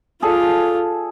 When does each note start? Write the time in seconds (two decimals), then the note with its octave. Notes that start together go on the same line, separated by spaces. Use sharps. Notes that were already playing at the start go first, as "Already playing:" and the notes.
0.22 F4 G#4 A4 D5